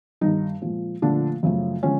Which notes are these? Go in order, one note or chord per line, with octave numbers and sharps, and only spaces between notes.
G2 D#3 G3 D#4
A#2 F3 G#3
A#2 D3 F3 A3 D4
F#2 C#3 F3 A3
D3 F3 G#3 C#4